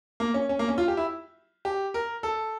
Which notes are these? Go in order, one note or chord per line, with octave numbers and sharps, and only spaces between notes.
A#3
C#4
C#4
A#3
C#4
F4
G4
E4
G4
A#4
A4